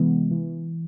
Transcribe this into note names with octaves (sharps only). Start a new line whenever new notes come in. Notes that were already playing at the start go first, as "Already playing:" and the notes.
Already playing: C3 E3 G#3 B3
E3